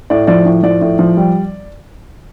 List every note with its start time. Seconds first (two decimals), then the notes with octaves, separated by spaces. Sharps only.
0.10 A2 D5
0.27 F3 D5
0.45 A2
0.63 F3 D5
0.81 A2
0.99 F3
1.17 G3